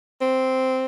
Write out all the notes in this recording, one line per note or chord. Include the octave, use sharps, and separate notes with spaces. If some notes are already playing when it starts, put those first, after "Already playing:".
C4